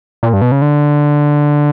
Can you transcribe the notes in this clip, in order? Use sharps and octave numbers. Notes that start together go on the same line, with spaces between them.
A#2
G2
B2
C#3
D3